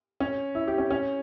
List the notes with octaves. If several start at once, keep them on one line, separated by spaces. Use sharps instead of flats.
C#4
E4
G4
C#4
C#4